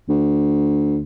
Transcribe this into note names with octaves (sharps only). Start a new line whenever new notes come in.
D2